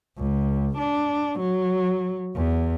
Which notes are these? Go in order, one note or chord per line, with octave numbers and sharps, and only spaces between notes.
C#2
D4
F#3
E2